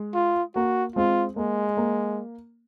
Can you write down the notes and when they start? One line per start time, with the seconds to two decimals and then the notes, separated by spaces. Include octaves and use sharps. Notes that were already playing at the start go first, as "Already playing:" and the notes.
Already playing: G#3
0.14 F4
0.56 A#3 F#4
0.96 G#3 C4 F4
1.36 G#3 A#3
1.77 A#3